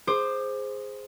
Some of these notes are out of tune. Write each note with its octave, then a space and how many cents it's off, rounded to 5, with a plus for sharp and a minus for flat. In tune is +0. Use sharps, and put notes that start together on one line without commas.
G#4 +0 C5 +0 D6 +25